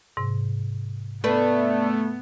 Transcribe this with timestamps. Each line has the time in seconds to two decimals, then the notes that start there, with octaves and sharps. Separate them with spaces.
0.17 G#2 C3
1.24 A3 B3 D4 B4 E5